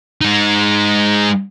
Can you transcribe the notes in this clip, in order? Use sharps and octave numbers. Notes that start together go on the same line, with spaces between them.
G#3 D#4